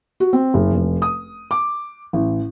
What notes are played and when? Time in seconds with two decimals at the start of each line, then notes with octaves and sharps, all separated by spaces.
0.20 F#4
0.33 C4
0.54 F#1
0.72 F1
1.02 D#6
1.51 D6
2.13 A1